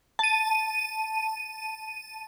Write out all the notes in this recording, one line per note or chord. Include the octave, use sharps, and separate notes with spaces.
A5 D#7